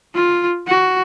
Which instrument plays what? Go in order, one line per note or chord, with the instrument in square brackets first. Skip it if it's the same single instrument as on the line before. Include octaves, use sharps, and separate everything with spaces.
[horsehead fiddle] F4
F#4